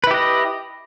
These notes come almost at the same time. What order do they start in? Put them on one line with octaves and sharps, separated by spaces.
B4 E4 G4 D#5